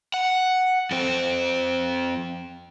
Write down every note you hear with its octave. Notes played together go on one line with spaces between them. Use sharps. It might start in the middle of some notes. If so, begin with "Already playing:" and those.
F#5
F2 C4